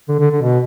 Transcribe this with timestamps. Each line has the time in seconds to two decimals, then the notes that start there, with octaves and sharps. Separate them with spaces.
0.09 D3
0.20 D3
0.31 D3
0.42 B2